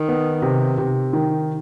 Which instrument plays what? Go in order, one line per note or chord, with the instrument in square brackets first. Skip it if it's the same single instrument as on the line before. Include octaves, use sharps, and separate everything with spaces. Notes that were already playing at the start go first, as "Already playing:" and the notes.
Already playing: [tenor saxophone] D#3
[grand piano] B3
C3
C3
D#3